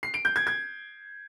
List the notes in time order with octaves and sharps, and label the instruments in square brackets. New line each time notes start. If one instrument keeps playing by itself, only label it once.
[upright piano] C7
D7
G6
G#6
G#6